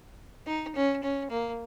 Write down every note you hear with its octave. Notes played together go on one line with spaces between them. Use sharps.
D#4
C#4
C#4
A#3